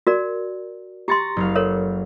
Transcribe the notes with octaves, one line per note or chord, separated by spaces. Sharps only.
F#4 A#4 D5
G4 A#5 C6 C#6 A6
F#1 F5
A4 A#4 C#5